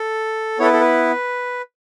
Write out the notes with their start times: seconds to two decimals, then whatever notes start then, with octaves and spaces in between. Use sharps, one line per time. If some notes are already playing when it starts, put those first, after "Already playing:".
Already playing: A4
0.59 B3 E4 A4 C#5
0.65 B4
0.73 A4
0.81 B4